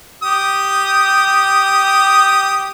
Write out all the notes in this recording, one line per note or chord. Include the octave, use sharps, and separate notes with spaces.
G4 D#6